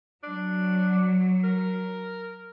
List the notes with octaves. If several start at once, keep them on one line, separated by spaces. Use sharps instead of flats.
F#3 D4
A#4